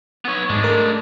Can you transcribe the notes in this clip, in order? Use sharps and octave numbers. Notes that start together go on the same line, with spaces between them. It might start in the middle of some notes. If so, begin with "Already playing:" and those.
B3 C#5
G#2 G#3 D4
A3 A#4